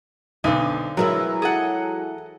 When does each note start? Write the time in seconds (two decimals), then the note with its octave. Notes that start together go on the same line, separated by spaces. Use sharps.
0.44 B1 D3 C4 D#4
0.97 E3 F#3 G#3 E4 A#4
1.42 G#4 A4 F#5